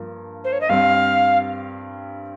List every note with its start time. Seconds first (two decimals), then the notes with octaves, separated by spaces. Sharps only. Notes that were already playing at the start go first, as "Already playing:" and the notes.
Already playing: G2 F3 A#3
0.44 C5
0.53 C#5
0.61 D#5
0.69 G2 G3 C4 F5